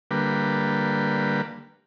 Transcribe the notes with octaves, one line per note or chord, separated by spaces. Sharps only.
D3 G3 A#3 B4